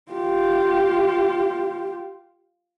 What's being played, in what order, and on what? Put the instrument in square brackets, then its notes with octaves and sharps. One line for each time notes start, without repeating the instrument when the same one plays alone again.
[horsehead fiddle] F4 G4